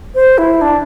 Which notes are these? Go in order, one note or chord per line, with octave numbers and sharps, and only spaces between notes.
C5
E4
D4